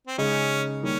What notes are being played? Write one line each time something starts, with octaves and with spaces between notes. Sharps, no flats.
C4
C#3 G#3 C#4 D#4 G#4
D#3 G3 A#3 C#4